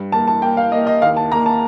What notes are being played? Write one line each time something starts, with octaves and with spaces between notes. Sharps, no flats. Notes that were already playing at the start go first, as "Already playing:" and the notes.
Already playing: G2
A#3 A5
A5
A#3 G5
F5
A#3 D#5
D#5
D#2 F5
A5
A#3 A#5
A5